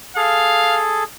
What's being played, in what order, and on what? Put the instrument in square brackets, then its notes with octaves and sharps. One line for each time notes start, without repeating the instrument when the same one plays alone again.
[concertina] G#4 A4 [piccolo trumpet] F5